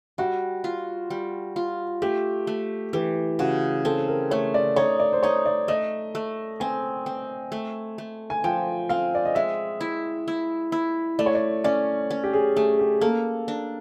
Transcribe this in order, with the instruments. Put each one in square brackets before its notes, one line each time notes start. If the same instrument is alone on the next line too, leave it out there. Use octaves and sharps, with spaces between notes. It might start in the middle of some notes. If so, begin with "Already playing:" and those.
[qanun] G3 [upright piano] F#4
[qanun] F4
G3
F4
[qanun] A3 [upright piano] G4
[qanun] A3
[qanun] E3 [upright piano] G4
[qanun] C#3 [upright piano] F#4
[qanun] C4 [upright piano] A4
[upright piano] A#4
[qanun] A3 [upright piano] C#5
[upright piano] D5
[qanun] D#4 [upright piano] C#5
[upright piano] D5
C5
[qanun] D#4 [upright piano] C#5
[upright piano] D5
[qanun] A3 [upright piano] D#5
[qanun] A3
[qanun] C4 [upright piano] G#5
[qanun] C4
A3
A3
[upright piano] G#5
[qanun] F3 [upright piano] G5
[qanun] C4 [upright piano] F5
[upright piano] D5
D#5
[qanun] G#3 [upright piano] E5
[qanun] E4
E4
E4
[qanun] A3 [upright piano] D5
[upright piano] C#5
D5
[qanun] C#4 [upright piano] D5
[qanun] C#4
[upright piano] G4
G#4
[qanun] A3 [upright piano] G#4
[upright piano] G4
[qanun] A#3 [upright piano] A4
[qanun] D4